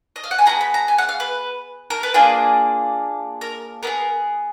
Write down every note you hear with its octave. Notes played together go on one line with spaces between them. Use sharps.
D#5
F5
F#5
G#5
B3 F4 G#4 A#5
B5
A#5
G#5
F#5
F5
B4
A#4
B4
A#3 D4 F4 G#4 D5
A#4
B3 D4 G#4 A#4